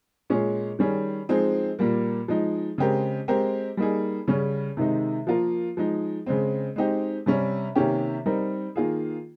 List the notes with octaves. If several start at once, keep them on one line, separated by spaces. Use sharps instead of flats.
A#2 G#3 C#4 G#4
D#3 G3 C#4 G#4
F3 G#3 C4 D#4 G#4
A#2 G3 A#3
F3 G#3 D#4
C#3 G#3 C4 G4 A#4
G#3 C4 G4 A#4
G3 A#3 D#4 G#4
C#3 G3 C#4
C3 D#3 G#3 D#4
F3 A#3 F4 A#4
F3 G#3 D#4
C#3 G#3 C4
G#3 C4 D#4 G4
C3 G3 C#4
C3 D#3 A#3 C#4 G4
G3 C4 D#4 A#4
D#3 A#3 F4 G#4